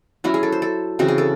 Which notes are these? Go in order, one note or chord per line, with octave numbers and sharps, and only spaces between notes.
F#3 C#4 E4 F#4
G#4
A4
C5
A4
C#3 E3 C4 F#4
G#4
A4